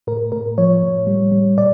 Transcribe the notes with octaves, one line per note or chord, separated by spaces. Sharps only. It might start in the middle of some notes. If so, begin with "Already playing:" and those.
A2 A#4
A2 A#4
F3 C#5
A2
G3
G3
A#2 D5